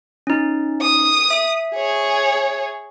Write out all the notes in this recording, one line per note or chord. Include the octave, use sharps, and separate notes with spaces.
C#4 D#4
D#6
E5
G#4 C#5